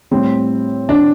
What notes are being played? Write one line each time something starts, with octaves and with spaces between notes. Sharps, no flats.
A2 G3 C4
D4